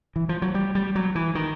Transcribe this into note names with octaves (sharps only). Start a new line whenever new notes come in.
E3
F3
F#3
G3
G3
F#3
E3
D#3